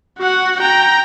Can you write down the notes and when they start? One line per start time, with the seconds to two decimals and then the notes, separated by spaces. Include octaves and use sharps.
0.19 F#4 F#5
0.61 G5 A#5